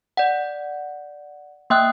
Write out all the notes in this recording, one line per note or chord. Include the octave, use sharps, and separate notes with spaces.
D5 F#5
A#3 E5 G5 D#6 F#6